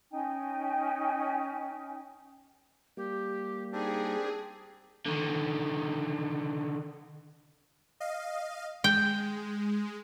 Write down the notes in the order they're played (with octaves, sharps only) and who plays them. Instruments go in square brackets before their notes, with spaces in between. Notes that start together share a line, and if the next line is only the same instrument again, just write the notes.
[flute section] C#4 D#4 G5 G#5
[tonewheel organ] G3 A#3 [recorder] G4
[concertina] C4 D4 G4 [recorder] D#4 [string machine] G#4
[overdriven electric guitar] D3 D#3
[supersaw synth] D#5 F5
[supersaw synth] G#3 [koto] G5